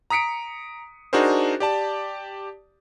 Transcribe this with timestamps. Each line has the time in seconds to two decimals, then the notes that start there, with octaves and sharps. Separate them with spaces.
0.10 A#5 D#6 B6 C#7 D7
1.13 D4 D#4 F#4 G#4 A#4 C5
1.60 G4 D5 A5